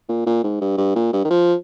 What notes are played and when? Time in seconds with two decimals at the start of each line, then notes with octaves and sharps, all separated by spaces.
0.09 A#2
0.26 A#2
0.44 G#2
0.61 G2
0.78 G2
0.96 A#2
1.13 G2
1.25 D#3
1.30 F3